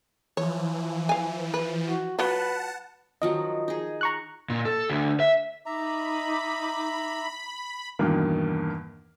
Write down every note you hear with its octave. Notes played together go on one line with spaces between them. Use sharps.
E3 F3 C#5
F5 G#5
B4
F#4
F#3 F4 B4 F#5 A5
D#3 F3 F#3 D#5
D#4 G#4
A#5 C#6 F#6
A#2
A4
D2
E5
D#4 E5 A#5 B5 D6
E2 G2 B2 D#3 A#3